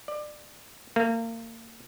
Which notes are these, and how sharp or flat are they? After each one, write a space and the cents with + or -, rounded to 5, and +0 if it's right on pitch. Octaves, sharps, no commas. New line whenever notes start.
D5 +25
A#3 -35